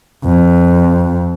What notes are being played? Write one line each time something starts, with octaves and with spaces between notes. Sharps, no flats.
F2